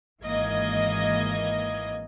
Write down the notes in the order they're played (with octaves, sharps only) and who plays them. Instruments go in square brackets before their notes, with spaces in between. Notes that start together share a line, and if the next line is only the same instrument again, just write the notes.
[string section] G#1 E3 A#3 D#5 G#6